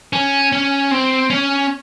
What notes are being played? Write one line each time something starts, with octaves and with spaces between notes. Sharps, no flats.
C#4
C#4
C4
C#4